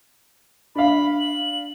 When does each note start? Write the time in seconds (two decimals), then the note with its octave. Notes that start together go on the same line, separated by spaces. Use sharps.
0.75 D4 F5 B5
1.19 F#7